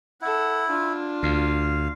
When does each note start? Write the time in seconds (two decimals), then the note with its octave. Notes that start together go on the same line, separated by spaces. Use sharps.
0.21 E4 A4 F#5
0.69 D4 F4
1.23 D2 F5